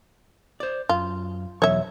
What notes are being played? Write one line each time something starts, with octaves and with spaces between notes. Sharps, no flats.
C5 D5
F#2 F4
B1 E2 F#3 C#5 E5